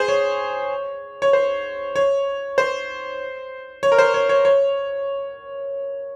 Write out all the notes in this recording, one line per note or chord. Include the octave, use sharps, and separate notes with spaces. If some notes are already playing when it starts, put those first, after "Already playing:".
Already playing: G#4 C5
C#5
C#5
C5
C#5
C5
C#5
A#4
C5
C#5
C#5
C#5